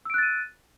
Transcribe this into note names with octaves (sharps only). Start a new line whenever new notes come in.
E6 F#6 A6 D7 D#7